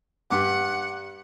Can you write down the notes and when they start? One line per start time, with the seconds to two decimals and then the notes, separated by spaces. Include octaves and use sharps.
0.30 G2 G3 F#5 D6